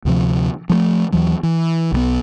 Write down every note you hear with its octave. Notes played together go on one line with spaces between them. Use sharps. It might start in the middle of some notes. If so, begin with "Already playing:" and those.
D2 C3 F3
F3 F#3 A3
D#2 E3 F#3
E3
B1 E3 B3